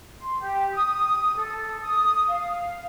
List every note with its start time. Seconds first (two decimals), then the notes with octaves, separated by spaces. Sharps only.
0.18 C6
0.40 G4
0.74 D#6
1.36 A4
1.81 D#6
2.28 F5